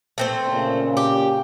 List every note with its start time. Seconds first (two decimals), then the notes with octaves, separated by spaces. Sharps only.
0.18 A3 C4 C5
0.48 A#2 C#3
0.97 G4